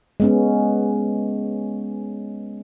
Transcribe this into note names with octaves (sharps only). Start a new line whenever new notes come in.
G#3 B3 C#4